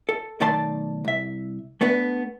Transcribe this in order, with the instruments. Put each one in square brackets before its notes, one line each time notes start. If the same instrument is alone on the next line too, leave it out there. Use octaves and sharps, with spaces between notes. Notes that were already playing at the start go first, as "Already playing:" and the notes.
[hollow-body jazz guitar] A4
B1 D#3 A3 D5 A5 C6
C2 E5
A3 B3 D4 B4